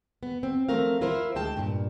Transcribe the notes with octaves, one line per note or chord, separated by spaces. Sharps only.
B3
C4
F3 A3 C4 A#4 F5
E4 F4 A#4 C5
D2 G#3 G5 A5
G2 A#2